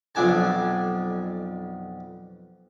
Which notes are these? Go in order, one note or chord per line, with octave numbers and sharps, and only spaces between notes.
B1 F2 D4 G#5 A5